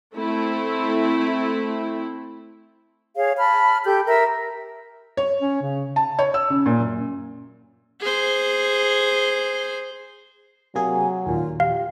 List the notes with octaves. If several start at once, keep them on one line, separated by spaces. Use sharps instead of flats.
A3 C4 E4
G#4 C#5 F5
A5 B5 F6
G4 A4 G6
A#4 E5 E6
C#5
C#4
C#3
A5
C#5
E6
C#3
A#2
F#2
G#4 C5
C3 F#3 A#3 G#4 G#5
D#2 A#2 F4
F4 G4 F5